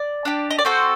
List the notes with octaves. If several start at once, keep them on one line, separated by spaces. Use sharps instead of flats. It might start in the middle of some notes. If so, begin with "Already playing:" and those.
Already playing: D5
D4 G4
D#5
D5
C4 F#4 A4 C5